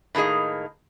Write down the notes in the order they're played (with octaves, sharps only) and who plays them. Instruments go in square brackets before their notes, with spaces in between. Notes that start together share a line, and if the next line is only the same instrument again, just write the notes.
[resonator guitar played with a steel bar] A2 D#3 A#3 G#4 D#5